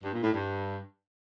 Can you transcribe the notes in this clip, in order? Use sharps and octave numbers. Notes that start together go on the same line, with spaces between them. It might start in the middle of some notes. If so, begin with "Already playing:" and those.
G2
A#2
A2
G2